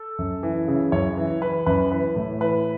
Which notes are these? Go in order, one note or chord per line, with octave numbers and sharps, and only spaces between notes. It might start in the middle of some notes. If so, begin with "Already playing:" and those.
Already playing: A4
F#2
E3
C#3
F#2 C#5
E3
E3 B4
F#2 B4
E3 B4
A2
E3 B4